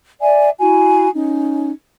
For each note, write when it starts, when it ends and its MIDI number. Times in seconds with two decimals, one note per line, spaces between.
0.21 0.50 74
0.21 0.50 76
0.21 0.50 80
0.60 1.08 64
0.60 1.08 66
0.60 1.08 80
1.14 1.70 61
1.14 1.70 63